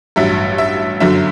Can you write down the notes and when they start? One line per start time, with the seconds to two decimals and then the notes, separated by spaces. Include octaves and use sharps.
0.16 A1 G2 F#3 E5
0.58 E5
1.00 G1 F#2 D3 F#3 E5